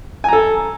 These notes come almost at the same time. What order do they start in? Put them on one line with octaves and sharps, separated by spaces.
G#5 A#5 A4